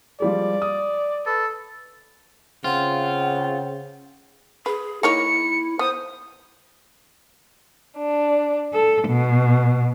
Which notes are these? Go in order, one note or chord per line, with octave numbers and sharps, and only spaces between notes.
F3 G3 G#3 D5
D#6
A4 B4
C#3 C4 F4 F#5
G#4 B4
A#3 D#4 E4 C#5 C#7
B3 C5 D#6
D4
A4
B2